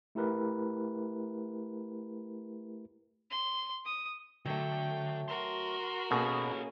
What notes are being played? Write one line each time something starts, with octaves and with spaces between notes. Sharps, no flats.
A3 E4 G4 A#4 B4
C6
D#6
D3 F#3 A3 G5
F#4 A#4 C6
B2 A#3 C#4 G#4 A4 B4